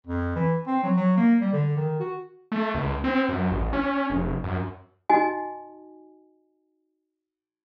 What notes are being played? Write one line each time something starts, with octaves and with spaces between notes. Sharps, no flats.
F2
E3
C4
F#3
F#3
A#3
G3
D3
D#3
F#4
A3
C#2
C4
F#2
A1
C#4
F1
F#2
D#4 F#4 D#5 G#5